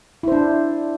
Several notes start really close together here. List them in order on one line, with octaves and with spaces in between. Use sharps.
E4 C5 D4